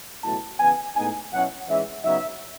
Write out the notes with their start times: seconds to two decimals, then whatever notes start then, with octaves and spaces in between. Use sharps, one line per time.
0.23 C#2 B2 F#3 A3 E4 A5
0.59 C#3 E3 B3 G#5
0.96 A2 G#3 B3 D#4 G#5
1.32 B2 F#3 C#4 E4 F#5
1.69 G#2 E3 G#3 C#4 E5
2.04 C#3 F#3 B3 D#4 E5